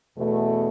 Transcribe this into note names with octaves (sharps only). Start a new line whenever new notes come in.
E2 B2 A3